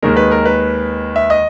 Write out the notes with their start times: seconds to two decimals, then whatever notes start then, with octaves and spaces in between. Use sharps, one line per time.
0.03 D#2 D#3 G#3 A#4
0.17 B4
0.31 A#4
0.45 B4
1.16 E5
1.30 D#5